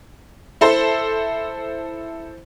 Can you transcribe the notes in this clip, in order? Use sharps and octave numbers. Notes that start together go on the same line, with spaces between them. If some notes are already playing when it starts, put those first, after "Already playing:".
E4 A4 C5